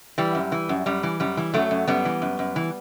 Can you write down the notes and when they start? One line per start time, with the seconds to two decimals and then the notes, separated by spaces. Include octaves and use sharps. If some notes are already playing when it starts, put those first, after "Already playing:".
0.18 E3 G3
0.35 F#2
0.52 E3
0.69 F#2
0.86 F#2 G3
1.03 E3
1.20 F#2 G3
1.37 E3
1.54 F#2 F#3 A3
1.71 F#2
1.87 F#2 G3 B3
2.05 E3
2.22 F#2
2.39 F#2
2.56 E3